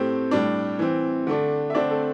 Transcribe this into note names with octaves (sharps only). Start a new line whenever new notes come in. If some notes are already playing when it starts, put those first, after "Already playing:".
Already playing: A2 A3 C4 G4
A2 G3 D4
E3 C4
D3 A3 D4
E5
D3 A3 C4 D4 D5
A3 A4